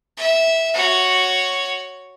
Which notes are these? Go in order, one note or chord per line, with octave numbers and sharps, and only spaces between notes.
E5
F#4 C#5